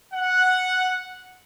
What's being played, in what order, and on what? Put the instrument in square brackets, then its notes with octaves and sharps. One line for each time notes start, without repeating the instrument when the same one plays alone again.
[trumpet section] F#5